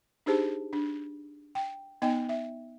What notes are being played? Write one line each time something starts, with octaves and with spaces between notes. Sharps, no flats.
D4 D#4 G4 G#4 C5 A5
D4
G5
B3 D#4 D#5 G5
E5